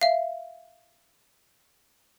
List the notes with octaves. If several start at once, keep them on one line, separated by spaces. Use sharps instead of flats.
E5 F5